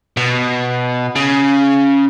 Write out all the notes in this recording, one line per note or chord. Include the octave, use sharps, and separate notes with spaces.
B2
C#3